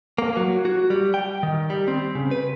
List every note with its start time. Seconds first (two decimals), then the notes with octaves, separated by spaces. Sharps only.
0.18 A#3
0.37 F#3
0.65 F#4
0.90 G3
1.14 G5
1.43 D#3
1.70 G3
1.88 C4
2.15 C#3
2.31 B4